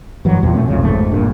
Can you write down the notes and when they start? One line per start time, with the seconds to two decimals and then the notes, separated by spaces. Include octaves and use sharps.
0.25 G2 E3 F#3
0.43 E2 A#2
0.55 B2 A3 C#4
0.68 B1 F2 C#3
0.84 G#1 F2 G#2 A3
1.12 A#1 G2 A#2 D4